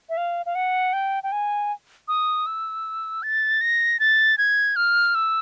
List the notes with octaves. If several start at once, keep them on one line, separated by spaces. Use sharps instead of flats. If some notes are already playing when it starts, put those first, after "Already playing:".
E5
F5
F5
F#5
G5
G5
G#5
D#6
E6
A6
A#6
A6
G#6
F6
E6